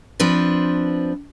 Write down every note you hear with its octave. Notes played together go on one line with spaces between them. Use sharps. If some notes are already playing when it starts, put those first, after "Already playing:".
F3 C4 D4 B4